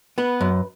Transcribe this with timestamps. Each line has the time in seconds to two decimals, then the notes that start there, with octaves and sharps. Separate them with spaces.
0.18 B3 B4
0.41 F#2